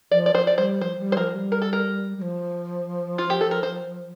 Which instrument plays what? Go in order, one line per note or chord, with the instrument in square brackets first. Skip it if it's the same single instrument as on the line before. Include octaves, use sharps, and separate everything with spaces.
[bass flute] F3 [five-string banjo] D5
[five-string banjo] D5
[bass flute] F3 [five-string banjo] C5
[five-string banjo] D5
[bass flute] G3 [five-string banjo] C5
[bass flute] F3 [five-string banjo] C5
[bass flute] G3
[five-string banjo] C5
[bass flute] F3 [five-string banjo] A#4
[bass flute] G3
[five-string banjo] A#4
A4
A#4
[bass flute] G3
F3
[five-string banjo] F4
G4
A4
A#4
C5